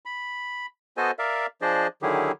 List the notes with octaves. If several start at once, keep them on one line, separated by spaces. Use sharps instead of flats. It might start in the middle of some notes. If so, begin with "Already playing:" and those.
B5
B3 F#4 A4 C5 D#5 G#5
A#4 D5 E5 F5
F3 D4 G#4 C5 D5 D#5
D3 D#3 F#3 E4 G4 G#4